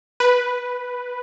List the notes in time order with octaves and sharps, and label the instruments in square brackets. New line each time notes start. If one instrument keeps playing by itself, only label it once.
[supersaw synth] B4